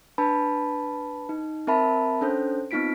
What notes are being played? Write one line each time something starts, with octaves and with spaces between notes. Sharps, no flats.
D4 B4 A5 B5
D#4
C4 A#4 E5 A5 B5
C#4 D4 A4 C5 G6
B3 C4 D#4 F4 B6 D7